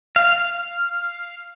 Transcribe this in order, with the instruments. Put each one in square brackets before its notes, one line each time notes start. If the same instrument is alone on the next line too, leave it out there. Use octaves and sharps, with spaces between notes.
[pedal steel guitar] F5